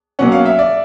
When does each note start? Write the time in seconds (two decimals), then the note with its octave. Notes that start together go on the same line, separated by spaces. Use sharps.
0.19 B2 F#3 A#3 C#4 F#5
0.32 F5
0.45 E5
0.59 D5